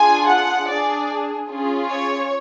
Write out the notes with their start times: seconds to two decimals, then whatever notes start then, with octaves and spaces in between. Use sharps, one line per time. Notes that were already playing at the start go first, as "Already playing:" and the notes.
Already playing: D4 F4 G#4 G#5
0.27 F#5
0.67 D4 G#4 D5
1.49 C#4 F4 G#4
1.89 C#5